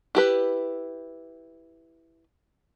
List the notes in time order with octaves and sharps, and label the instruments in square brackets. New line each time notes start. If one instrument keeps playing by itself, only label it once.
[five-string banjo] E4 G4 B4